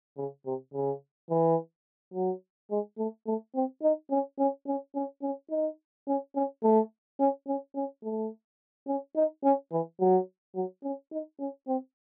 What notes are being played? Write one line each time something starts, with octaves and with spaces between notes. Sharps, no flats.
C#3
C3
C#3
E3
F#3
G#3
A3
A3
C4
D#4
C#4
C#4
C#4
C#4
C#4
D#4
C#4
C#4
A3
C#4
C#4
C#4
A3
C#4
D#4
C#4
E3
F#3
F#3
C#4
D#4
C#4
C4